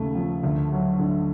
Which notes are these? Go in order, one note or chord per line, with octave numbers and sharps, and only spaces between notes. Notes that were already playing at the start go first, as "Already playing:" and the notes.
Already playing: D#2 C#3 A3
F3
D2
F#3
D3